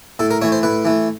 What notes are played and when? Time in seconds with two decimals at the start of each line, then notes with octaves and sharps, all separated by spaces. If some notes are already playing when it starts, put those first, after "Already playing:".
0.19 A2 A4
0.31 A#4
0.42 E3 A3 C#5
0.52 C5
0.63 A2 B4
0.85 E3 A3